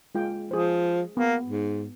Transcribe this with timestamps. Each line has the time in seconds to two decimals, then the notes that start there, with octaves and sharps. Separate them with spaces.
0.15 G#3 F4 G5
0.51 F3 G#4 C5
1.17 A#3 B3
1.45 G#2